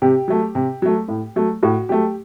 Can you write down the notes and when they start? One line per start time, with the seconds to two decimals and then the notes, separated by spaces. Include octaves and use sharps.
0.02 C3 G4
0.28 F#3 A3
0.55 C3
0.82 F#3 A3
1.08 A2
1.36 F#3 A3
1.63 A2 F#4
1.89 F#3 A3 G4